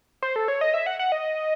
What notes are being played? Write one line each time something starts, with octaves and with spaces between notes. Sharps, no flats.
C5
A4
C#5
D#5
E5
F#5
F#5
D#5